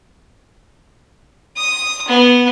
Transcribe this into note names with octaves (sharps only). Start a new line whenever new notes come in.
D#6
B3